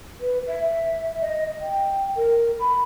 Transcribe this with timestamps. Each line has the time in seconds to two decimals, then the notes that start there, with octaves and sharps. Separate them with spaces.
0.20 B4
0.47 E5
1.21 D#5
1.61 G5
2.16 A#4
2.60 B5